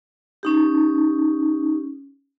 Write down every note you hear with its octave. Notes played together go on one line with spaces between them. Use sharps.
C#4 D#4 G4